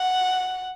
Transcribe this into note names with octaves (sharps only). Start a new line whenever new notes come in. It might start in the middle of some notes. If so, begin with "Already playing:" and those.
Already playing: F#5